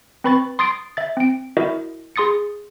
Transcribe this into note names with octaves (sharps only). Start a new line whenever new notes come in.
C4 B4 B5 C#6 A6
C6 D#6 A6 C7 D7
E5 A6
C4 D7
E4 F#4 A#4 D#5 E5
G#4 C6 D#6 A6 C#7